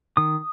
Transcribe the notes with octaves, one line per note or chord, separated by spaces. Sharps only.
D#3 D#6